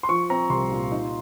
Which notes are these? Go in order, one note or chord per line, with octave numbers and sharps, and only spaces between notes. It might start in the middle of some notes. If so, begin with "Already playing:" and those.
C6
F3 C#6
C4 A#5
C2 C6
A#2
D#4